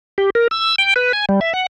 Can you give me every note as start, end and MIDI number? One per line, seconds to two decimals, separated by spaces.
0.18 0.30 67
0.35 0.48 70
0.51 0.75 88
0.78 0.94 79
0.96 1.12 71
1.13 1.25 80
1.29 1.40 55
1.41 1.53 76
1.54 1.66 78